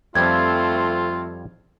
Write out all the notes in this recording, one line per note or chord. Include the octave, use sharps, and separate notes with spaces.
F2 F3 G3 A3 C4 F4 G#6